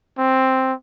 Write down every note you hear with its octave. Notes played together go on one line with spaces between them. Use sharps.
C4